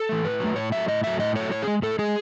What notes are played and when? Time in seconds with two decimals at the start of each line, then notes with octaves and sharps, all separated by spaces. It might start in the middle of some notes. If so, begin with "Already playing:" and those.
Already playing: A4
0.09 E3 A3
0.25 A2 B4
0.40 F#3 A3
0.56 A2 C#5
0.72 F#3 A3 E5
0.88 A2 D#5
1.04 F#3 A3 E5
1.19 A2 D#5
1.35 F#3 A3 C#5
1.51 A2 C#5
1.62 G#4
1.67 G#3
1.82 A2 A4
1.99 G#3 G#4